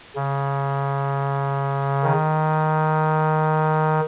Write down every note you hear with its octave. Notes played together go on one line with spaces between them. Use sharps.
C#3
D#3